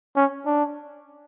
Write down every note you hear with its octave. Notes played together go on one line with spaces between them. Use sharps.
C#4
D4